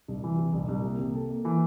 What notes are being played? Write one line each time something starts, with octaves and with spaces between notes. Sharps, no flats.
C2
E3
C3
C2
C2
A#3
C3
A4
A#3
E3